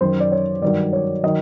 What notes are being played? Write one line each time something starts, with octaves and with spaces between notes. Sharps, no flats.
F#2 D#3 F#3 C5
D5
C#5
G2 D#3 F#3 D5
C#5
D#3 F#3 D#5